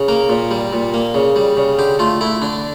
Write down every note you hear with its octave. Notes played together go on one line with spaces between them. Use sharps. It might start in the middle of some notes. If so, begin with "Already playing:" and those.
Already playing: C#3
A#3 A#4
A#2
G3
A#2
A#3
C#3
G3
C#3
D3 G4
A3 F4
A3 E4
D3 D4